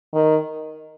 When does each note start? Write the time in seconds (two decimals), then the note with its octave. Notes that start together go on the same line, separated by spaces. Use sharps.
0.14 D#3